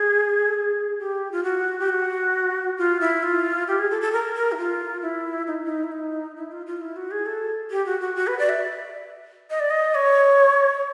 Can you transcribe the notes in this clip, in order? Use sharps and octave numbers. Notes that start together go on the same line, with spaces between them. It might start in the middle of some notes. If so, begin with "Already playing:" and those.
Already playing: G#4
A4
G#4
G4
F4
F#4
G4
F#4
F4
E4
F4
G4
G#4
A4
A4
A#4
A#4
E4
F4
E4
D#4
D#4
E4
D#4
E4
F4
F4
E4
F#4
G#4
A4
G4
F#4
F#4
F#4
B4
D5
E5
D#5
D5
D#5
C#5